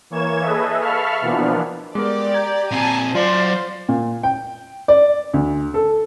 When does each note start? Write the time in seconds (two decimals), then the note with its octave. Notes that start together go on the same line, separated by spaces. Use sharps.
0.10 E3 A#3 C#5 G#6 E7
0.41 G#4 A4 B4 D#5 E5
0.80 E5 F5 A5 B5 C#6 F6
1.21 B2 E3 F3 A#3 B3 D4
1.95 G#3 B3 G4 A#4 D5 D6
2.34 A#5 G6 G#6
2.71 A#2 C4 G#5 A5
3.15 F#3 F4 C5 D5 C6
3.89 A#2
4.23 G5
4.88 D5
5.34 D2
5.74 A4